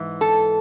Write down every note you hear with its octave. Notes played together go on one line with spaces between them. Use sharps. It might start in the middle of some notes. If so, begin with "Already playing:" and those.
Already playing: G#2 E3
A4